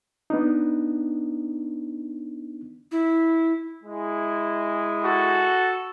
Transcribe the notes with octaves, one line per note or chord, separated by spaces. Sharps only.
B3 D4 D#4
E4
G#3 E4
F#4 A4